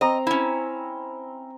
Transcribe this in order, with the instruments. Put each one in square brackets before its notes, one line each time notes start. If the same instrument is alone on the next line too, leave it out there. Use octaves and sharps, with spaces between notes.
[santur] C4 A#5 [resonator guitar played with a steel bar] D#5
[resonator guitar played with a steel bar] C#4 E4